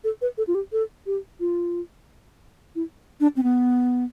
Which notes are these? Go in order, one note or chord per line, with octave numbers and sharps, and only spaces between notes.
A4
B4
A4
F4
G4
A4
G4
F4
E4
D4
C4
B3